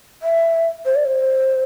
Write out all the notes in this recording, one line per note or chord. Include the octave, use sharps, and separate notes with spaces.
E5
C5
D5
C5